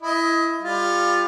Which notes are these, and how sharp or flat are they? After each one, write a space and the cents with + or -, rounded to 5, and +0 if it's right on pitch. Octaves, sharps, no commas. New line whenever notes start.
E4 +10 D#5 +25
G3 +30 F4 +5